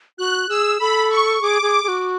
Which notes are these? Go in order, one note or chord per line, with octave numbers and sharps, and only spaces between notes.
F#4 F#6
G#4 E6
A4 B5
C#6
G#4 D6
G#4
G#4
F#4